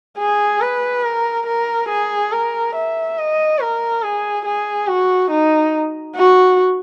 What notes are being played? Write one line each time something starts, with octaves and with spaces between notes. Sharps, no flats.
G#4
B4
A#4
A#4
G#4
A#4
E5
D#5
A#4
G#4
G#4
F#4
D#4
F#4